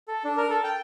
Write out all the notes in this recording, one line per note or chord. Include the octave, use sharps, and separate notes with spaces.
A4
D4
A#4
A4
G5